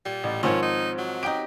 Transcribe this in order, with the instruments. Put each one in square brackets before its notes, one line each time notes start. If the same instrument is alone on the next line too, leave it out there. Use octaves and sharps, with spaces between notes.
[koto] A#2 [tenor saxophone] G3
[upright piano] A1
[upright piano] G#2 D#3 F3 [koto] C4 C#5 [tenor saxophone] C#4
[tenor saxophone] D#4
F#3
[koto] D#4 G4 [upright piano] G5 D7